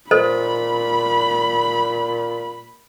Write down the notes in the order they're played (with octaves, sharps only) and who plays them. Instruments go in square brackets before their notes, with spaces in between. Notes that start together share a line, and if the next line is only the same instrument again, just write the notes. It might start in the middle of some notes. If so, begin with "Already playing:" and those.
[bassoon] A#2 [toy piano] A4 C5 D#5 [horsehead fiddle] B5